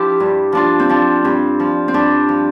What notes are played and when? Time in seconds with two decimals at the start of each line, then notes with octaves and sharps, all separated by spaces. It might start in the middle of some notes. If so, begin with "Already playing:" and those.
Already playing: F3 D4 E4 G4
0.20 G2
0.52 F3 D4 F4
0.80 C4
0.89 F3 D4
1.24 G2 C4
1.60 F3
1.88 C4
1.94 G2 D4
2.29 F3